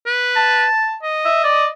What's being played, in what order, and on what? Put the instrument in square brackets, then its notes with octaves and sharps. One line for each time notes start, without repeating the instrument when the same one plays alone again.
[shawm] B4
[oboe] A5
[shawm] D#5
[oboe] E5
D5